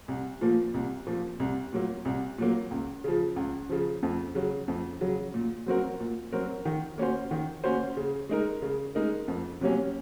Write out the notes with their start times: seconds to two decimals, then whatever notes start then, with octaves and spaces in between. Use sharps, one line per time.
0.08 C2
0.41 A#2 F3 A#3
0.74 C2
1.07 A#2 F3 A#3
1.40 C2
1.73 A#2 F#3 A#3
2.05 C2
2.38 A#2 F#3 A#3
2.71 C#2
3.04 C#3 F3
3.36 C#2
3.69 C#3 F3
4.03 F2
4.35 C#3 F#3
4.68 F2
5.01 C#3 F#3
5.34 A#2
5.66 F#3 C4 F#4 A#4
6.00 A#2
6.32 F#3 C4 F#4 A#4
6.65 D#3
6.98 A#3 C#4 F#4 C5
7.31 D#3
7.64 A#3 C#4 F#4 C5
7.97 C#3
8.29 G#3 D#4 A#4
8.62 C#3
8.95 G#3 D#4 A#4
9.28 F2
9.61 C3 F#3 A#3 C#4